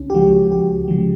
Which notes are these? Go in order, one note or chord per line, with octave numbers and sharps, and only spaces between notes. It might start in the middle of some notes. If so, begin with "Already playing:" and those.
Already playing: C#2 C#4
G4
C#3 F3 G#3 F#4
C#2 G4
C#3 F3 G#3